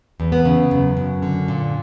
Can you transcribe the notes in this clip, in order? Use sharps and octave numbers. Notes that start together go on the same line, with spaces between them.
E2
B3
C#3
F#2
F#2
D3
A#2